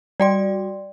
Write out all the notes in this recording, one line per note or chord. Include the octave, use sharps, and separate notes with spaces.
G3 F#4 D5 G5 C6